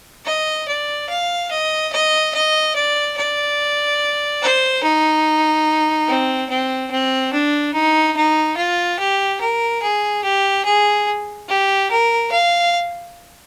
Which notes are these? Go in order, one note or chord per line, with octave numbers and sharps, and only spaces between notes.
D#5
D5
F5
D#5
D#5
D#5
D5
D5
C5
D#4
C4
C4
C4
D4
D#4
D#4
F4
G4
A#4
G#4
G4
G#4
G4
A#4
F5